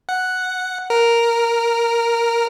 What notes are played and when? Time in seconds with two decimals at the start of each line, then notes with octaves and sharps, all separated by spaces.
0.09 F#5
0.90 A#4